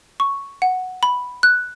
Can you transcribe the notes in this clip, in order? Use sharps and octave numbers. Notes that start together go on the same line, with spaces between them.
C#6
F#5
B5
F#6